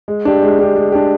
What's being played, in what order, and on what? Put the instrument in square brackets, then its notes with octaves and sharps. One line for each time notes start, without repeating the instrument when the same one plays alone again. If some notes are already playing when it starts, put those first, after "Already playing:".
[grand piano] G#3
D4 G4
G#3
D4 G4
G#3
D4 G4